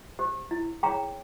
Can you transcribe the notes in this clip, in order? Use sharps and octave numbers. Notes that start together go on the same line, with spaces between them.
G4 C5
E4
G#4 C#5 G5 A#5